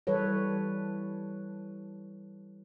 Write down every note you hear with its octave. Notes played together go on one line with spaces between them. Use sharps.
E3 G3 A4 B4 C#5